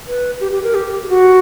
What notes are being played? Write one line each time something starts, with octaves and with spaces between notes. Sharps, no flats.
B4
G4
G4
A#4
G4
G4
F#4